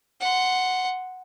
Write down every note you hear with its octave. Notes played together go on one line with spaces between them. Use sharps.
F#5 C6